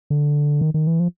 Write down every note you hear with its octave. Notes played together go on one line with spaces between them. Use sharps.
D3
D#3
D#3
E3
F3